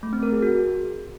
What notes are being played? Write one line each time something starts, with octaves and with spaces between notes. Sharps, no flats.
A3
C4
A#4
G#4
F#4